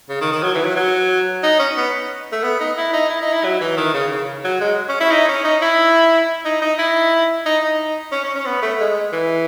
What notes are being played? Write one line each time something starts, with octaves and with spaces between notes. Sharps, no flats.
C#3
D#3
D#3
F#3
E3
F#3
F#3
D#4
C#4
B3
A3
B3
D#4
E4
D#4
E4
D#4
E4
F#3
E3
D#3
C#3
C#3
F#3
G#3
C#4
E4
D#4
C#4
D#4
E4
D#4
D#4
E4
D#4
D#4
C#4
C#4
C#4
B3
A3
G#3
E3